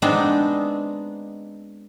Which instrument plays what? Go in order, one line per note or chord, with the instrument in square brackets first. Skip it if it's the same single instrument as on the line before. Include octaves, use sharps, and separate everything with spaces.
[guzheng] G#3 B3 C4 D4 D#4